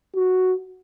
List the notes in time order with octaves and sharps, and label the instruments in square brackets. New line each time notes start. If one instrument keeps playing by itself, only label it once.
[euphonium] F#4